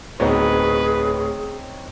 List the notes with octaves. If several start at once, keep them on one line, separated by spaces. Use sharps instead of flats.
D1 B3 C4 D#4 G#4 B4 C#5